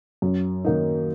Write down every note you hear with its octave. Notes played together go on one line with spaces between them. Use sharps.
F#2
D#3 A#3 D#4